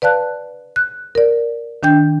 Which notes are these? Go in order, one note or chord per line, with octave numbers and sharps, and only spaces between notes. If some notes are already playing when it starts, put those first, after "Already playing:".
B4 D5 F5 A5 F#6
F#6
A#4 D5
D#3 D4 G5 G6